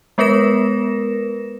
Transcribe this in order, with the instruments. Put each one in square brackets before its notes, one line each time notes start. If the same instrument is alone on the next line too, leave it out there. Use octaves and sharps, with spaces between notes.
[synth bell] G#3 B3 A#4 B4 A#6 E7